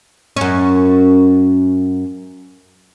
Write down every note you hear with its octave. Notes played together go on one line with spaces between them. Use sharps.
F#2 C#4